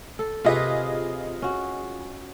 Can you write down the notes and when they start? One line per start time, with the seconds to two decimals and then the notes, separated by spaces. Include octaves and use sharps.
0.19 A4
0.44 C3 F4 G#4 B4 D#5
1.42 C#4 F#4